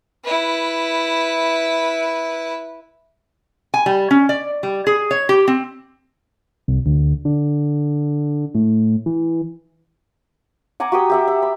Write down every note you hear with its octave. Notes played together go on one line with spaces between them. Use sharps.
E4 B4
G#5
G3
C#4
D5
G3
G#4
C#5
G4
C4
C2
D2
D3
A2
E3
F#5 G#5 A#5 D6
F#4 G4 G5 D#6
G4 E5 F#5
E5
B5